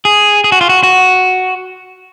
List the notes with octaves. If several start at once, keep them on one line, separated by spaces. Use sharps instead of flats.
G#4
G#4
F#4
F4
F#4
F#4